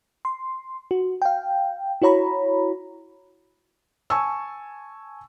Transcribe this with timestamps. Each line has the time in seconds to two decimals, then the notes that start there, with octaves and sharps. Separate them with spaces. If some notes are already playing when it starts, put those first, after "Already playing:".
0.25 C6
0.91 F#4
1.22 F5 G5
2.02 E4 F#4 C#5 A#5 B5
4.10 G#5 A5 C#6 E6